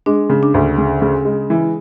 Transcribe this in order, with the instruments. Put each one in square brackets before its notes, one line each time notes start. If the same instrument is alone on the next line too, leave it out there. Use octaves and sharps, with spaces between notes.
[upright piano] G#3 [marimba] D4
[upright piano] C#3
[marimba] D4
[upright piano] D2
C#3
C#3
G#3
E3